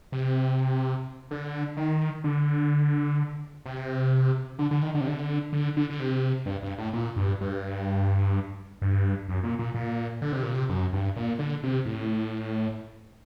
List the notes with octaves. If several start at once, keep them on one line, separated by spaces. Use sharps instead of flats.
C3
D3
D#3
D3
C3
D3
D3
D#3
D3
C3
D3
D3
D3
D3
C3
G2
G2
A2
A#2
G2
G2
G2
F#2
A#2
A#2
A#2
D3
C3
A#2
C3
F#2
G2
A#2
D3
C3
A2